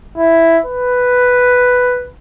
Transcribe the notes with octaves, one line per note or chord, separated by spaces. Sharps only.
E4
B4